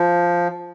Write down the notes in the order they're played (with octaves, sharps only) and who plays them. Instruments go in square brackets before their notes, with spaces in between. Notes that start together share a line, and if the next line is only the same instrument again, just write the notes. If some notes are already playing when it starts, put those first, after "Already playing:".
Already playing: [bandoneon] F3